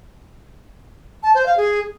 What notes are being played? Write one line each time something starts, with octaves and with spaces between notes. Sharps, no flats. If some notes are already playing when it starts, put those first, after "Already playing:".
A5
C5
F5
G#4